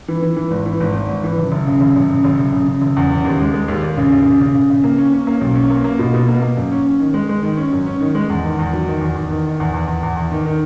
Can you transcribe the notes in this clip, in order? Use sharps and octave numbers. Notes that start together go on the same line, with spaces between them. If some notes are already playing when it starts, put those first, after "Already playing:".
E3
E3
E3
G#1
E3
G#1
G#1
G#1
E3
F#1
F#1
C#3
F#1
F#1
C#3
F#1
F#1
C#3
C#3
F#1
E2
C#3
D#2
G#3
G#3
D#2
D#2
C#3
D#2
C#3
C#3
C#3
C#3
A#3
C#4
C#4
A#3
B1
C#4
A#3
A#3
B2
B2
A#3
A#3
F#2
C#4
C#4
D#3
G#3
G#3
D#3
C#4
F#2
C#4
D#3
G#3
E2
D#3
E2
F#3
D#3
E2
E2
D#3
D#3
E2
E2
E2
E2
E2
D#3
D#3